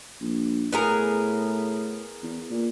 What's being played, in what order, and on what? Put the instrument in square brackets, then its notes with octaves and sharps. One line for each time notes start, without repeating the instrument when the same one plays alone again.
[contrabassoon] A#1
[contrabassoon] A2 [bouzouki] B3 G#4 A#4
[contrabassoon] E2
A#2